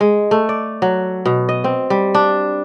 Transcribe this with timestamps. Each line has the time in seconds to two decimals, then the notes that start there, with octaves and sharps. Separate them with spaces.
0.01 G#3
0.31 A3
0.49 D5
0.82 F#3
1.26 B2
1.49 D#5
1.64 C4
1.90 G3
2.15 D4